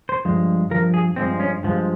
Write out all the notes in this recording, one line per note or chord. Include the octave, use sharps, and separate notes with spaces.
C5
G2 F3 G#3
G2 F3 A#4
G#4
G2 F3 G#3 C4
C#4
G2 F3 G#3